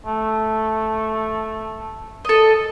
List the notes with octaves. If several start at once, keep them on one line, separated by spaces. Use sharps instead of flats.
A3
A4 D#5